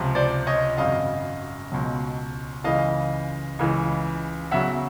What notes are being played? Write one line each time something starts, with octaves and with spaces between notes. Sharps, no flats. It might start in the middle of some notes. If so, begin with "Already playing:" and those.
Already playing: C#2 C3 F3
C5 D5
C#5 D#5
G#1 F#2 C#3 D#5 F5
C#2 B2 F#3
C#2 C#3 E3 D#5 F5
C#2 C#3 E3
E2 C#3 F#3 E5 F#5